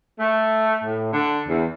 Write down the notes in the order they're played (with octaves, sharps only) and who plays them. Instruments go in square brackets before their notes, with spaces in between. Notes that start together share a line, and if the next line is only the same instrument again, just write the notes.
[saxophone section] A3
A2
D3
E2